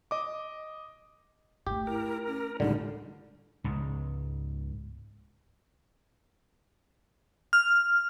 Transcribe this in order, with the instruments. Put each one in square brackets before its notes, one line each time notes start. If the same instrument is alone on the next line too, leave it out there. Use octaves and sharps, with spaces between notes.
[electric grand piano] D#5 D6
[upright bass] G#2 A3 [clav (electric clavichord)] G4
[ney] E4 [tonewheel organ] A#4
[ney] C#4
[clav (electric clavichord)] C#2 D3 [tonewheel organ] A2 G3 [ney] D#4
[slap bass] C#2 G#2
[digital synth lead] F6